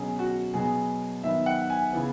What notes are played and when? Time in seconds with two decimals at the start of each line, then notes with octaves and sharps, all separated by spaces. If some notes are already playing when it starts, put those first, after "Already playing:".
Already playing: B2 F#3 C#4 G#4
0.19 F#4
0.54 B2 F#3 B3 G#4
1.23 D#3 F#3 B3 E5
1.46 F#5
1.70 G#5
1.93 C#3 E3 B3